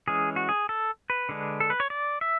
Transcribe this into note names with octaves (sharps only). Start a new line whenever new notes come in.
E3 G#3 C#4 G#4
F#4
G#4
A4
B4
D3 G#3 D4
A4
B4
C#5
D5
E5